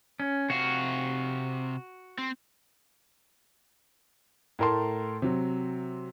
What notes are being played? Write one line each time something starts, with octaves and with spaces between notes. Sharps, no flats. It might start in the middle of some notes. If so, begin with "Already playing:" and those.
C#4
C3 F#4 F5
C4
A2 A3 A#4 A5 C6
C3 F#3